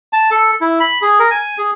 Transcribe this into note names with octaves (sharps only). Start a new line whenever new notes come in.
A5
A4
E4
B5
G#4
A#4
G#5
G#4